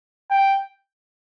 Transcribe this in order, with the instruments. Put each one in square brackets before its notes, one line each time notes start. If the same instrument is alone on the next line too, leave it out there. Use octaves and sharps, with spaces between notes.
[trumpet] G5